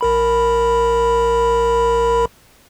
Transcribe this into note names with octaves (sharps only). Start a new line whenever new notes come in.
A#1 A#4 B5